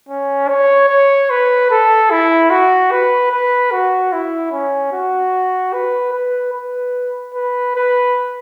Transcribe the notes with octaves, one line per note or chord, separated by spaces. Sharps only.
C#4
C#5
C#5
B4
A4
E4
F#4
B4
B4
F#4
E4
C#4
F#4
B4
B4
B4
B4
B4